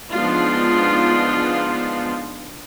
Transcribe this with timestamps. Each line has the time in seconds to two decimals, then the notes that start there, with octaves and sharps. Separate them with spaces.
0.12 F3 G#3 B3 D4 D#4 F4